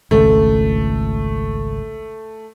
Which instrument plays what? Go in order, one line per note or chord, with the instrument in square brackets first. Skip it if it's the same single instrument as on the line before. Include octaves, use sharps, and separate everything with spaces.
[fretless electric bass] G#1 C#2 [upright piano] A3